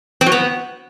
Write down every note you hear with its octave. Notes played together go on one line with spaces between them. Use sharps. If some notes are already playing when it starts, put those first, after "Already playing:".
C4
F#3
B3